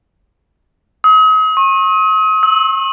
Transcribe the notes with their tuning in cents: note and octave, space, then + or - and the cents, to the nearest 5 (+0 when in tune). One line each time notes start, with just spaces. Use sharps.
D#6 +40
C#6 -40
E6 -25